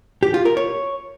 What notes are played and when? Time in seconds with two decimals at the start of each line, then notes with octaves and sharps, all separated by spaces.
0.23 G4
0.34 F4
0.45 A#4
0.57 C#5